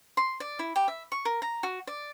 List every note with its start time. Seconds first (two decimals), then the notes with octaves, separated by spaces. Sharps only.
0.17 C6
0.40 D5
0.59 E4
0.76 G4
0.88 E5
1.12 C#6
1.25 A#4
1.42 A#5
1.63 F#4
1.87 D5